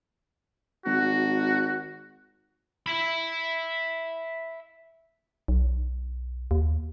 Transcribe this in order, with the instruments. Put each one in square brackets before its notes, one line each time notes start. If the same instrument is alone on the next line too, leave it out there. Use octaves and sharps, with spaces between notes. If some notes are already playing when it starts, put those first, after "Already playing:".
[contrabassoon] G#1 [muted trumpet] F#4
[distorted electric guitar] E5 B5
[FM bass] B1
D#2